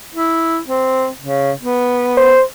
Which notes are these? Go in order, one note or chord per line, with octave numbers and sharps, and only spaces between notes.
E4
C4
C#3
B3
C5